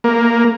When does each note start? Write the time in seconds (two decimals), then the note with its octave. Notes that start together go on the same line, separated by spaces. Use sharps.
0.04 A#3